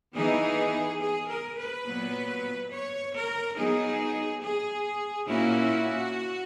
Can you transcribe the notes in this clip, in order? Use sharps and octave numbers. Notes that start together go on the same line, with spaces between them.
E3 B3 D#4 G#4
G#4
A#4
B4
A#2 F#3 B3
C#5
A#4
F#3 B3 D#4 G#4
G#4
A#2 A#3 C#4 E4 F#4